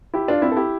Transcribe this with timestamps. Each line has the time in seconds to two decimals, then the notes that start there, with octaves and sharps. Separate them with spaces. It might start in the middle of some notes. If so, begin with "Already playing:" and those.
0.14 E4 G4
0.28 D4 F4
0.42 C4 E4
0.51 A4
0.57 E4 G4